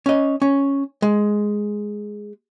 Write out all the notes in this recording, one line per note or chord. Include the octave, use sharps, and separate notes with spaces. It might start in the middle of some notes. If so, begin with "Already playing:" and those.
C#4 D#5
C#4
G#3